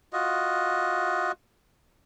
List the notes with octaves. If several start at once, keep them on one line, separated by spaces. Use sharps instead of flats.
F4 F#4 D#5